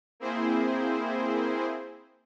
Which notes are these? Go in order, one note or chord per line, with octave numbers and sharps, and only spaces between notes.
A#3 C4 E4 G#4 C5